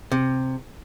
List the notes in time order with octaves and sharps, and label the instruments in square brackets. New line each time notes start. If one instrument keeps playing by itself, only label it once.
[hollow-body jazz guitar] C3